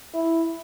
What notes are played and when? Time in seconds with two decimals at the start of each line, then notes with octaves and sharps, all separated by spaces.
0.14 E4